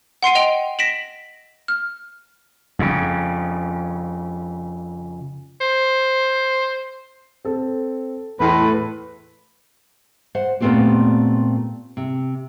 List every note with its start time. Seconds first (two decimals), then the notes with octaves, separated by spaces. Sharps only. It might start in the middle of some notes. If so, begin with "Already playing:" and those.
0.23 F#5 C6 C7 D#7
0.35 D#5 F#5 G5 D7 F7 G7
0.79 A#6 B6 D7 E7 F#7
1.68 F6
2.79 F2 C#3
5.61 C5
7.45 C4 A4
8.40 E2 A2 B4 C6
10.35 C5 F#5
10.60 A#2 A3 B3 C4 F#4 G4
11.97 C3